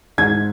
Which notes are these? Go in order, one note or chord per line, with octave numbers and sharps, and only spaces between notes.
G#2 G#6